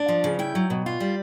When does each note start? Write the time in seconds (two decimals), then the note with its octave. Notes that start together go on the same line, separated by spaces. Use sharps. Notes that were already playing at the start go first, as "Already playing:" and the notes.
Already playing: D4
0.08 F3
0.24 C#3
0.39 E4 G5
0.55 F#3
0.70 B2
0.86 F4
1.00 G3